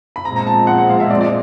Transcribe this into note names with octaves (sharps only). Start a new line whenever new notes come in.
B5
A#2 F3 G#3 C4 A#5
A#5
A5
F#5
F#5
F5
E5
D5
D5